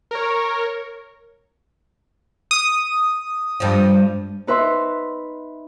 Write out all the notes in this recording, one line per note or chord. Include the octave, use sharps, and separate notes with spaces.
A#4 C#5
D#6
G2 F3
D#4 B4 E5 C6